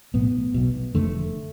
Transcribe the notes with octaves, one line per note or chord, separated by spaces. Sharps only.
B1 A2 B3
B1 B2
F1 F2 D3 A3